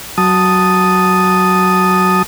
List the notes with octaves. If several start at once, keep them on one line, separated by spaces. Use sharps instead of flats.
F#3 A5 D#6